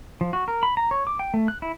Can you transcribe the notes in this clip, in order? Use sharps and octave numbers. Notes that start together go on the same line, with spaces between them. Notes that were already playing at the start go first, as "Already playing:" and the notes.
F3
F#4
A#4
B5
A#5
C#5
D6
G5
A3
F#6
E4